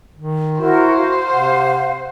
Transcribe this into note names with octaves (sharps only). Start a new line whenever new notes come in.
D#3
E4 F#4 A#4 C5
F5
C3 F#5